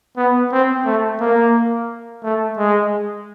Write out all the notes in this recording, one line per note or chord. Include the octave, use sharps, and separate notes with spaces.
B3
C4
A3
A#3
A3
G#3